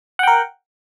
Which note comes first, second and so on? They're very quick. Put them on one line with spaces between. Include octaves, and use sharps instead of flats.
F#5 G5 A#4